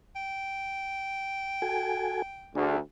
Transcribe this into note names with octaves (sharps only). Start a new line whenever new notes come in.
G5
F#4 A4 G#5
D2 D4 G#4